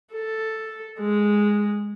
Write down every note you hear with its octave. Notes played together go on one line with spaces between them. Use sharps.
A4
G#3